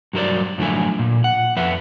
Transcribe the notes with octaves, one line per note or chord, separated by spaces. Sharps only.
G2 F#3 A#4 C5 D5
F#2 A2 D3 F3 E4 G#5
A#2
F#5
F2 B4 E5 F#5